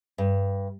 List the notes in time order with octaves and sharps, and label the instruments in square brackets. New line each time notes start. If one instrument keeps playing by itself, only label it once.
[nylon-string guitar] G2